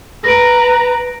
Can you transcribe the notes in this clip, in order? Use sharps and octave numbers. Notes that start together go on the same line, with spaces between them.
B4 A#5 A#6 D7